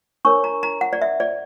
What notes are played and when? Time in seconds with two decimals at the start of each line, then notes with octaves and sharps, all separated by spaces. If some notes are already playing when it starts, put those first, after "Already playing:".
0.25 D4 A#4 C#5 C#6
0.44 A#5
0.63 A#5
0.81 F#5
0.93 D5
1.02 E5
1.20 D5